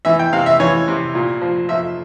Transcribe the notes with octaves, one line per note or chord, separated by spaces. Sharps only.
E3 E5
G5
C3 F5
E5
E3 C#5
C3
A#2
F3
F3 E5